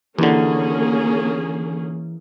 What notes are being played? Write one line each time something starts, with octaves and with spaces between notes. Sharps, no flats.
D#2 D3 E3 A#3 C#4 G#4